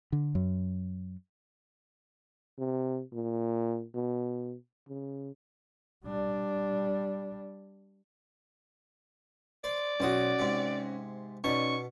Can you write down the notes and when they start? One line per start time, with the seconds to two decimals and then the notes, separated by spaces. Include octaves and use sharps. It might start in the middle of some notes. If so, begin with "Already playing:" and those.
0.12 D3
0.35 F#2
2.58 C3
3.13 A#2
3.94 B2
4.88 C#3
6.05 G3 D4
9.64 C5 D5
10.00 B1 C#4 F#4 C5 D#6
10.39 G#2 C3
11.44 B2 C#4 D#4 D5 A5 C#6